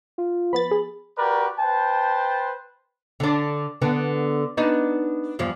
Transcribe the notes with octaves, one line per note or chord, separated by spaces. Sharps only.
F4
F3 B3 B5 A6
G#4
F#4 G4 A#4 B4 D5
B4 C5 G5 A5
D3 D4
D3 B3 D4
B3 D4 D#4
E2 G2 F3